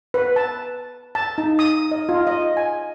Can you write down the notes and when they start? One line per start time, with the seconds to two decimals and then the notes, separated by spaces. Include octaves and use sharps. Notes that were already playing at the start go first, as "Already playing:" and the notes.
0.14 B4
0.36 A5
1.15 A5
1.38 D#4
1.59 D#6
1.92 D#5
2.09 F4
2.27 D#5
2.57 G#5